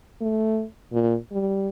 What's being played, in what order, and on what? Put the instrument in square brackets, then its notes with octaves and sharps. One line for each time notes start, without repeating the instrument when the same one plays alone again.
[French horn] A3
A#2
G3